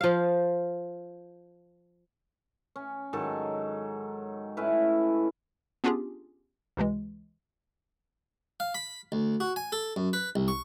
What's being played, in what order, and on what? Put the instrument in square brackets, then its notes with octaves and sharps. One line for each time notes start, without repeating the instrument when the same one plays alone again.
[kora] F3 F5
[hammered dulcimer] C#4
G#2 D#3 F#3 A4
A2 C#4 E4 B4
[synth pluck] B3 C#4 D4 F4 G4 G#4
C#2 C3 E3 G#3
[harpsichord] F5
B5
D2
F#4
G#5
A4
F#2
B4
C2
C#6